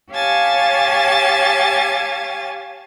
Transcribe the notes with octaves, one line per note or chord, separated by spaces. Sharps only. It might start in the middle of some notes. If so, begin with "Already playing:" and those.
G4 C#5 F5 G#5 A5 A6